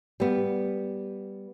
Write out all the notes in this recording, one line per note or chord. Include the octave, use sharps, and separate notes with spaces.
G3 B3